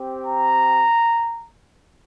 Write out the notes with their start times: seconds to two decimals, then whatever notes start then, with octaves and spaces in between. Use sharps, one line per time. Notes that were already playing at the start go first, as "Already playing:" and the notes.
Already playing: C4 G4
0.25 A#5